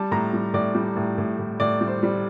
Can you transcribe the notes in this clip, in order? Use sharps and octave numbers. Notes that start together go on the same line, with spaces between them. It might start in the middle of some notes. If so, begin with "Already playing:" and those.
Already playing: G3 A5
A2 A#5
G3
A2 D5
G3
A2
A2
A2
A2 D5
G3
C5
G3